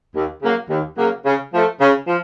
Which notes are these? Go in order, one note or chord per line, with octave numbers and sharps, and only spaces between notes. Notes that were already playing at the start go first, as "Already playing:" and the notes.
D#2
C#3 F#3 A#3
D#2
C#3 F#3 A#3
C#3
F3 A3
C#3
F3